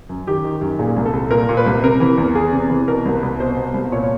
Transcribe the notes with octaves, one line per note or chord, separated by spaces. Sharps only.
F#2
D#3 G4
D#3
F#2
A#2 G#4
C2
A4
C2
A#2 A#4
A#2
B4
C2
C3 A#4
E3
E2
E2 G#4
C3
E3
B2 A#4
C2
B4
C2
B2 C5
B2
C2
A#2 C#5